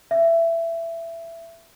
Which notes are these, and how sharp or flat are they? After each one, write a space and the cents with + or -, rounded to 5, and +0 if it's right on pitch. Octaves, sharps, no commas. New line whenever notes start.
E5 +15